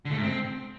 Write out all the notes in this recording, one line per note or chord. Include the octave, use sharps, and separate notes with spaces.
D3
A3
G#2
C4